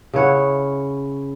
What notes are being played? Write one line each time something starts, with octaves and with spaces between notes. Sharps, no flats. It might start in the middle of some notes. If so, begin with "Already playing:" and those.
C#3 E4 C#5 F#5